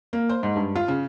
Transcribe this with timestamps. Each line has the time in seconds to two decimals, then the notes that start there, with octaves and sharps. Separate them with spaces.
0.13 A#3
0.29 C5
0.43 G#2
0.56 G2
0.76 F4
0.88 C#3